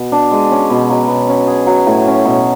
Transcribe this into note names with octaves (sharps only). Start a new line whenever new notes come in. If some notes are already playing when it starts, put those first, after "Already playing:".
Already playing: B2
D4
G#3
C#4
B2
F#3
B2
C#4
G#4
F#3
A2
C#4
B2